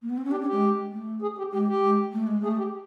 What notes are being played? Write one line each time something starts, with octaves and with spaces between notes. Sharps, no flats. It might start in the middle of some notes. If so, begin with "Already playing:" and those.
A#3
B3
C4
C#4
D4 G4
C#4
G#3 G4
A3
G#4
G4
G#3 G4
G4
G#3
A3
G#3
A3 G#4
G4